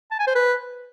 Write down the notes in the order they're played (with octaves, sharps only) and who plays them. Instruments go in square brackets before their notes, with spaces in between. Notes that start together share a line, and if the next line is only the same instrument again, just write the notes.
[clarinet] A5
G#5
C5
B4